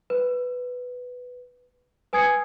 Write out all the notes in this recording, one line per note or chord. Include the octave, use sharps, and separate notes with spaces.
B4
B4 G#5 D#6 G#6 C7 C#7